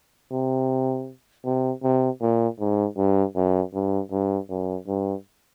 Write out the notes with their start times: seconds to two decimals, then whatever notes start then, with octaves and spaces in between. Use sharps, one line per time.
0.31 C3
1.45 C3
1.83 C3
2.21 A#2
2.59 G#2
2.97 G2
3.35 F#2
3.74 G2
4.11 G2
4.50 F#2
4.88 G2